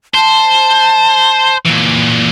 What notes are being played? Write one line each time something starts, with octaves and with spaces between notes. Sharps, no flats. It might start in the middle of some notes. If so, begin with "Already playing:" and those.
C5 A5
A#2 E3